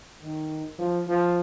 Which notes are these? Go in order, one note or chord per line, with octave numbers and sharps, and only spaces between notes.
D#3
F3
F3